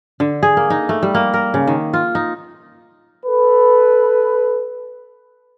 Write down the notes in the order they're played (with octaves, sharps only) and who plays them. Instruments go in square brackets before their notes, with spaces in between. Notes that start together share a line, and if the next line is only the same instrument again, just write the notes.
[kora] D3
G#4
A#3
D#4
A3
G3
A#3
A#4
C#3
D#3
F4
D#4
[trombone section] A4 B4